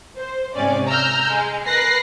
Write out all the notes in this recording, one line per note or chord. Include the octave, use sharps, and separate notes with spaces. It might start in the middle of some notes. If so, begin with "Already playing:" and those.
C5
G#2 C3 C#4 D5
A#5 E6 F6 G6
G#3
A#4 B4 F#6 A#6 C7